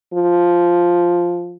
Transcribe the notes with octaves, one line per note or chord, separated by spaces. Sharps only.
F3